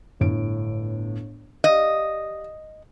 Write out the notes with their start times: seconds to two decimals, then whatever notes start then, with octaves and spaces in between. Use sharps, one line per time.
0.20 G1 A2 D7
1.64 G4 D5 D#5 F5